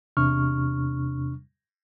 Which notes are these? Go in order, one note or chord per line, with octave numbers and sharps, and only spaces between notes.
E2 C3 D4 C#6 F6